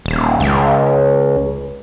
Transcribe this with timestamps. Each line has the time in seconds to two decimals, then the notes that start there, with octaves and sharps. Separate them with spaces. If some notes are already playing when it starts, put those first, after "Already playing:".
0.06 D#1
0.40 C#2